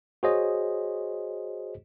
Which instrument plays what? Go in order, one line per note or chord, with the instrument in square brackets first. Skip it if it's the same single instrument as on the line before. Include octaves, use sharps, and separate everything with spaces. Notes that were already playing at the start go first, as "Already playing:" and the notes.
[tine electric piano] F#4 G#4 C5 C#5 D#5